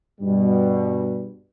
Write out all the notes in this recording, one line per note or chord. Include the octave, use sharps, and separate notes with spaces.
G2 B2 G3